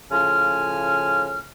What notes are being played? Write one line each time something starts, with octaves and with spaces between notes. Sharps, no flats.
A2 C#3 F3 G#5 F6